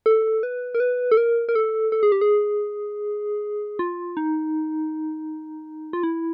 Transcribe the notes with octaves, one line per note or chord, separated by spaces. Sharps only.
A4
B4
A#4
B4
A4
A#4
A#4
A4
A4
G#4
G4
G#4
F4
D#4
F4
E4